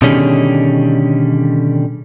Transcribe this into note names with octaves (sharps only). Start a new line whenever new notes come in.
B2 D3 D#3 G3 C#4 G#4